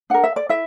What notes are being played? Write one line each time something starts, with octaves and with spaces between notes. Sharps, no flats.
D4 A#4 F#5
E5
D5
E4 E5